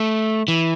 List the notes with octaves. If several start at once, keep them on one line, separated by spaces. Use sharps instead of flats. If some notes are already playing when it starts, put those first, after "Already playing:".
Already playing: A3
E3